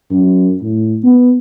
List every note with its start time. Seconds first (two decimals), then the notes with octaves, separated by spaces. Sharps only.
0.10 F#2
0.62 A2
1.04 B3